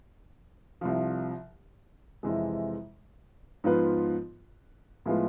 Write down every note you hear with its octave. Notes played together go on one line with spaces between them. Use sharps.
C2 C3 F3
F2 C3 E3 G#3
G#2 F3 B3 F4 B4
A2 F3 G#3 B3 F4